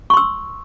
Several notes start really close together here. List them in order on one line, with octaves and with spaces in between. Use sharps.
C#6 C6 E6